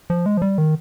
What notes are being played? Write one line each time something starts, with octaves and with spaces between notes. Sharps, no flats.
F3
G#3
F3
G3
D#3